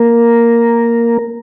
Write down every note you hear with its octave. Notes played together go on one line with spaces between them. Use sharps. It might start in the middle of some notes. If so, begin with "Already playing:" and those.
Already playing: A#3 A#4